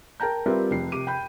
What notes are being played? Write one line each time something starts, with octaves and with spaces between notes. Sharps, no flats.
A#4 G5 A5 A#5 G6
G3 C4 F4 A#4 B4 E5
F1 C7
C3 D6 D#7
G5 B5 G6